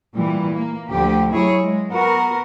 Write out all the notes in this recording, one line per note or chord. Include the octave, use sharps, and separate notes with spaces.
A#2 E3 G3
A#3
D2 D3 F3 G4
F#3 E4 G#4 C#5
G#3
B3 F#4 A#4